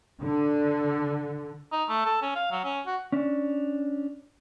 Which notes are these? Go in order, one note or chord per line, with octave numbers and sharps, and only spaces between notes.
D3
D#4
A3
A4
C#4
F5
F#3
C#4
F#4
C#4 D4